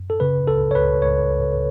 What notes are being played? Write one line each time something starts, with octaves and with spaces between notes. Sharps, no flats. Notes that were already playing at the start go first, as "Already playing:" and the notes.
Already playing: F#2
A4
C#3 B4
C#2 A4
C#5
C#2 B4
C#2 C#5
C#2